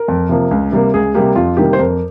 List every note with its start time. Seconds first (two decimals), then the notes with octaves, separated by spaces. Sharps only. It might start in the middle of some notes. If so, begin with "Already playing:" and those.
Already playing: A#4
0.08 F2
0.29 C3 F3 A#3
0.51 C#2
0.72 C3 G3 A#3
0.94 C#2 G#4
1.14 C3 G3 A#3 G4
1.35 F2 F4
1.57 C3 D#3 G3 A#3 G4
1.73 C5
1.79 F2 A#4